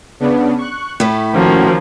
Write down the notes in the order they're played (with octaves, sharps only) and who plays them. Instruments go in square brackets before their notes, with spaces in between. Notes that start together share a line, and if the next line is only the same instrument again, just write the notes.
[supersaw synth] C#3 B3 D4
C#6 F#6
[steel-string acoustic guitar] A2 A3 [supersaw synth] B5
[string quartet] D#3 F3 A#3 [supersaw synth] C#4 F#4